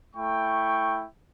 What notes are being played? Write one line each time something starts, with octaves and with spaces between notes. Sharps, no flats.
A3 E4 G5 C#6